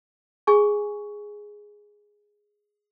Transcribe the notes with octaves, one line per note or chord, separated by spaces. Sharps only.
G#4 G#5 C#6